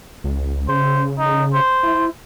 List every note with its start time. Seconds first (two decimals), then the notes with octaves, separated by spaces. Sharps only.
0.24 C#2
0.69 C#3 C5
1.18 D#4
1.54 C5
1.83 E4